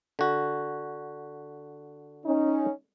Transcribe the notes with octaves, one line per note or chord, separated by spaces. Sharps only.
D3 F#4
C#4 D#4